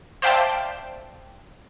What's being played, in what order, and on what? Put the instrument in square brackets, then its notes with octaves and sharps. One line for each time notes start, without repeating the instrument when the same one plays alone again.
[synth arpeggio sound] C5 D5 E5 F5 G5 A5